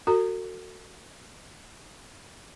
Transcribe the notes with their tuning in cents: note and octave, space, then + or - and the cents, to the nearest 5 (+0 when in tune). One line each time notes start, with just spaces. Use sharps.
F#4 +0 A4 +40 A#5 -20